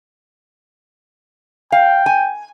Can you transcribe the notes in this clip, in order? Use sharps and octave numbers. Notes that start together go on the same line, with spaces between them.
F5 G5
G#5